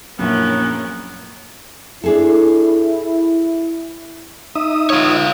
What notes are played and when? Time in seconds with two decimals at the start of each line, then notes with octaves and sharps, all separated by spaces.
0.19 A#1 F#2 A#2 A#3 B3 C#4 E4
2.04 D4 E4 G#4 A4
4.55 D#4 E5 D#6
4.90 F4 C#5